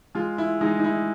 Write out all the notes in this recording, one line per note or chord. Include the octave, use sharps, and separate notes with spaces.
G#3 F4
E4
G#3 D#4
D#4
E4